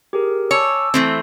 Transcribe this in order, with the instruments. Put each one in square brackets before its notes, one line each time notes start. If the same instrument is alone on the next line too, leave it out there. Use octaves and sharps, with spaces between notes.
[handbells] G4 G#4 A#4
[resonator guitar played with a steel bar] C#5 [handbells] G#5 A5 D6 [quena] E6
[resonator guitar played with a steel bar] E3 A3 C4